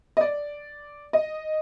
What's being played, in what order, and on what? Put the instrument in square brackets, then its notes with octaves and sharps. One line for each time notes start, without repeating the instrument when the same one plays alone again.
[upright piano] D#5
D5
D#5